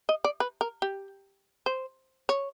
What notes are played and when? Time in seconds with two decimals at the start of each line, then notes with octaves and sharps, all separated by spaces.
0.09 D#5
0.24 D5
0.40 B4
0.61 A#4
0.82 G4
1.66 C5
2.29 C#5